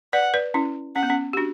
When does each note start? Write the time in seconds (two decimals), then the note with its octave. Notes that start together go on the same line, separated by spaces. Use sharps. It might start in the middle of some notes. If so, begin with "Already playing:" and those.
0.13 B4 D5 F#5
0.34 B4 D5
0.54 C#4 E4
0.96 C#4 F#5
1.03 B3
1.10 C#4
1.33 G4
1.37 D4 F#4